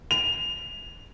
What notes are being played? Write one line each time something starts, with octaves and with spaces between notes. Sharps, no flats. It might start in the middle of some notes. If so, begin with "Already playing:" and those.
F7